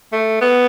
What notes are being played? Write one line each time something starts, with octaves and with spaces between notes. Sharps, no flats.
A3
B3